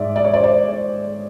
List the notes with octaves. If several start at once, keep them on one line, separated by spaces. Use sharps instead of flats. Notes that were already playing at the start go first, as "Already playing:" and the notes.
Already playing: G#2 G#3 D5 E5
D5
C#5
C5 D5
C5 D5